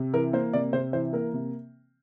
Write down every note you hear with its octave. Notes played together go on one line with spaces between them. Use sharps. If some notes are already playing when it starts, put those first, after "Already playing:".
Already playing: C3
E3 A#4
A#3 C5
C3 D5
C3 C5
E3 C5
A#3 A#4
C3